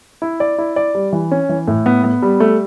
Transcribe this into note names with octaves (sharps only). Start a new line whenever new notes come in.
E4
D5
E4
D5
G3
E3
C#4
E3
A2
B3
B3
G3
A3